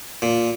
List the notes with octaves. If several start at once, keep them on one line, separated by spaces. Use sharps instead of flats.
A#2